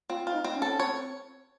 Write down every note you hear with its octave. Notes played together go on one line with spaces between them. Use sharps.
C4 F4
F4
D#4
C4
C#4
A4
C#4
C4 C#5